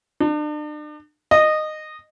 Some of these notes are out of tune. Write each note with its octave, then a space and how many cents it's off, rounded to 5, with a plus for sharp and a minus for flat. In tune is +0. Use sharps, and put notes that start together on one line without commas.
D4 +40
D#5 -15